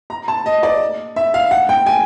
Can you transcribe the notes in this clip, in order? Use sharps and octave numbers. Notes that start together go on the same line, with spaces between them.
A#5
A5
D#5
D5
E5
F5
F#5
G5
G#5